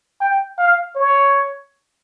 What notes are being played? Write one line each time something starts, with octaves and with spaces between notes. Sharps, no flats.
G5
F5
C#5